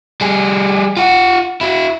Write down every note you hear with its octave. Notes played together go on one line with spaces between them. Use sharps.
G3 G#4
F4 F#5
E4 F#4